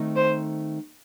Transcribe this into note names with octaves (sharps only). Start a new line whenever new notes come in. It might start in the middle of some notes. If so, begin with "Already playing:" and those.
Already playing: D#3 A3 C4 D#4
C5